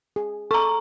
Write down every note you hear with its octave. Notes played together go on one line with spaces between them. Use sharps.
G#4
A4 A#5 C#6